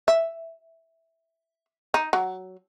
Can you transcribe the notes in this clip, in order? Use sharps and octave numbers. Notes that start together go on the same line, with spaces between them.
E5
D#4
F#3